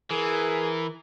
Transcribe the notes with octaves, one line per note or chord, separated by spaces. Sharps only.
E3 G#4 A#4